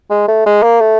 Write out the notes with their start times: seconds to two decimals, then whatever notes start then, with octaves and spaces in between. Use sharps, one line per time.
0.11 G#3
0.28 A3
0.46 G#3
0.63 A#3
0.81 A3